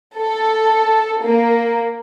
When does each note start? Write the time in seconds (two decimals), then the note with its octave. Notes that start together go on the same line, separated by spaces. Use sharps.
0.17 A4
1.22 A#3